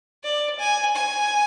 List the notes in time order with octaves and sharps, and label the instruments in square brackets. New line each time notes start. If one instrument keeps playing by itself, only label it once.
[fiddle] D5
G#5
G#5